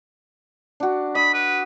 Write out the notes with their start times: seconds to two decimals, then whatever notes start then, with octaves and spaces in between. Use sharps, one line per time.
0.80 D4 F#4
1.15 D#5 B5
1.34 B4